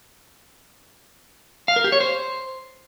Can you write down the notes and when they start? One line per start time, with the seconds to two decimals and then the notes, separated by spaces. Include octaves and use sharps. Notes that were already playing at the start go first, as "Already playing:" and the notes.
1.68 F5
1.76 A#4
1.84 G4
1.92 C#5
2.00 C5